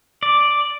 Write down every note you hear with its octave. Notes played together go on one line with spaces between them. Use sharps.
D5